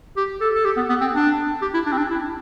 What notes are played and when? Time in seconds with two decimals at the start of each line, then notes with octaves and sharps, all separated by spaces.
0.17 G4
0.41 A4
0.55 A4
0.65 G4
0.77 B3
0.89 B3
1.01 C4
1.14 D4
1.62 G4
1.74 E4
1.86 D4
1.93 C4
1.98 D4
2.10 E4